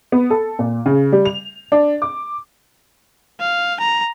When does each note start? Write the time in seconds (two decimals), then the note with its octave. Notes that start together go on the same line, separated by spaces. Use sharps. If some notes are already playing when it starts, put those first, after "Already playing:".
0.12 B3
0.30 A4
0.59 A#2
0.86 C#3
1.12 G3
1.25 F7
1.72 D4
2.02 D6
3.40 F5
3.80 A#5